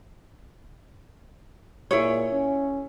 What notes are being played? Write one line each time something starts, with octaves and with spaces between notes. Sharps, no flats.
A#2 E4 G#4 C#5
C#4